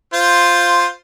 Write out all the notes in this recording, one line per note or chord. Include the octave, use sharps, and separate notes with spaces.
F4 C5